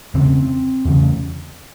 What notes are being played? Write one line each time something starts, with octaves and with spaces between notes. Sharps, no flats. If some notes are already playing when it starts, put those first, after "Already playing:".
E2 C#3 C4
E2 C#3